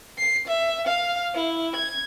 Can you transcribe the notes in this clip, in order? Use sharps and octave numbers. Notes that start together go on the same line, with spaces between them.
C7
E5
F5
E4
G#6